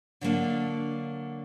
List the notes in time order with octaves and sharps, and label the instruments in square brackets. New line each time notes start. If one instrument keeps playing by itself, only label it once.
[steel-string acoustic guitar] D3 F#3 A#3 D4